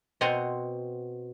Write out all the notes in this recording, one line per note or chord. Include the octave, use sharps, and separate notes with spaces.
B2 C4 F#5 G#5 A#5 C6